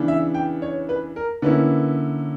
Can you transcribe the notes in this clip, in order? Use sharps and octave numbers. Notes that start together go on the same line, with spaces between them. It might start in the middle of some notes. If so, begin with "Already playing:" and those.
Already playing: C#3 E3 B3 D4
E5
G5
C#5
B4
A#4
D3 A#3 C#4 E4 B4